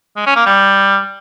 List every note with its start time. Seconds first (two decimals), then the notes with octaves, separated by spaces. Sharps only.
0.16 G#3
0.26 C#4
0.36 A#3
0.46 G3